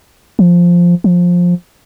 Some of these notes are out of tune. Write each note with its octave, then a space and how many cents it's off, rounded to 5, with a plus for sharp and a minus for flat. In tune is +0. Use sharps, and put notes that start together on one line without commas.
F3 +0
F3 +15